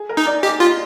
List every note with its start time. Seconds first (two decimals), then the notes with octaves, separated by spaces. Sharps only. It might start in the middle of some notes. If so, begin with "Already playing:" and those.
Already playing: G#4
0.09 A#4
0.17 D#4
0.26 D5
0.43 G4 D#5
0.60 F4